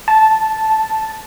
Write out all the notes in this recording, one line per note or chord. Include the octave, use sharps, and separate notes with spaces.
A5